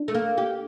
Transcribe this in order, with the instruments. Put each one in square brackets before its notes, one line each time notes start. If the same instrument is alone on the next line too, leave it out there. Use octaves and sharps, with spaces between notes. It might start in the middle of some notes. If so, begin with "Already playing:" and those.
Already playing: [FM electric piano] D4
[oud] A3
A#3
G4